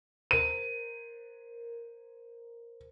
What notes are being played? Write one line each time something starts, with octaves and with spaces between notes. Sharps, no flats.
A#4 C5 D#7